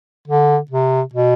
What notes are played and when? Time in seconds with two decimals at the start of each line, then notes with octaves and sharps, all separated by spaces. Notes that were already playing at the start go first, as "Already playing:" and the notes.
0.28 D3
0.71 C3
1.14 B2